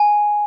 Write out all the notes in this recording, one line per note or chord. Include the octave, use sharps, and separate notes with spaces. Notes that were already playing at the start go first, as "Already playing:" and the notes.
Already playing: G#5